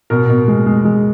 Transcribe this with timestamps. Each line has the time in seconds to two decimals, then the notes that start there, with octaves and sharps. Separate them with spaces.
0.10 B2 A#4
0.30 B2
0.48 G#3
0.66 G#3
0.85 G#3